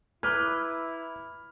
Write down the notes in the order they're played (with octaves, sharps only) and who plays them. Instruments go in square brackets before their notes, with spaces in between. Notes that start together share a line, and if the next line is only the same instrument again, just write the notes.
[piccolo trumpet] E4 [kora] B4 [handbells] A#5 D6 G#6 [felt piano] F6